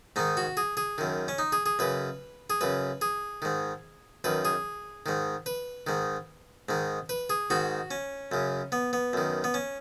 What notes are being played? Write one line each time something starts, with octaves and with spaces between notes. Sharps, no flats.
G#2 D#3 D#4
F#4
G#4
G#4
F#2 D#3
C#4
D#4
G#4
G#4
F#2 C#3 B4
G#4
F#2 C#3 B4
G#4
G#2 D#3
F#2 D#3 B4
G#4
G#2 D#3
B4
G#2 D#3
G#2 D#3
B4
G#4
G#2 D#3 F#4
C#4
F#2 C#3
B3
B3
F#2 D#3
B3
C#4